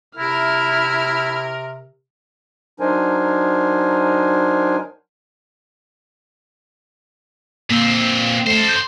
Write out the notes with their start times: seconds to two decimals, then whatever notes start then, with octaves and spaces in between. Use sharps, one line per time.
0.17 C3 E4 A#4 F6
2.80 F#3 D4 D#4 A#4 C5 G#5
7.70 A#2 A#3 C4
8.47 A3 A4 C5
8.68 G6